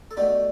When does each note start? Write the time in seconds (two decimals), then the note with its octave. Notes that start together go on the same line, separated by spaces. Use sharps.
0.11 A4
0.17 B2 A3 D4 G4